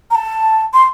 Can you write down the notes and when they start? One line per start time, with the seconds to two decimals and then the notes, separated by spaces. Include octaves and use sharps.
0.11 A#5
0.15 A5
0.74 C6